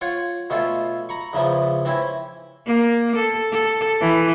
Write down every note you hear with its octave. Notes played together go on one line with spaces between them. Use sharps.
F4 C#5 F#5
B2 A3 C#4 F4 A4
A#5 B5 C#6
E2 C#3 E3 F3
E3 C4 C#4 E4
A#3
A4
A4
E3